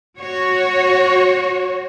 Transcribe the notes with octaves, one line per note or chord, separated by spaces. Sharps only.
F#4 C#5